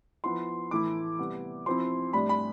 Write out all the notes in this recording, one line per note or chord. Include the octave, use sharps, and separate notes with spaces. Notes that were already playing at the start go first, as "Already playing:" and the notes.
F3 B3 E4 C6
A2 E3 A3 E4 D6
C3 G3 B3
F3 C4 E4 C6
A2 G3 D4 B5
B5